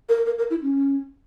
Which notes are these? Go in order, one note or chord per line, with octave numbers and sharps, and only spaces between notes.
A#4
A#4
A#4
E4
C#4